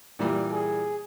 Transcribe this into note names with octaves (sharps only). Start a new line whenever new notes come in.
A#2 E3 G3
G#4